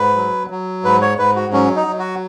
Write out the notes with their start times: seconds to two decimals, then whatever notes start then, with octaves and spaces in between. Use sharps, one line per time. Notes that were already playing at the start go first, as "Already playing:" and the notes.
Already playing: G#2 B4
0.16 F#3
0.50 F#3
0.84 G#2 B4
1.02 C#5
1.19 G#2 B4
1.36 F#4
1.53 F#3 C#4
1.76 D#4
1.87 F#3
1.99 F#4